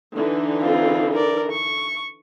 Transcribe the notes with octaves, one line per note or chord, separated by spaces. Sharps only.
D3 E3 D#4
C4 F4
A#4 D5
C#6